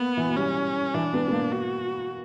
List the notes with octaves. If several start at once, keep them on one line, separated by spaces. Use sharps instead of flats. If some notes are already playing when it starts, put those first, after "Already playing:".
Already playing: A#3 B3
E3
F#3
G3 C#4
E3 D4
B3
B3
A#3
F#4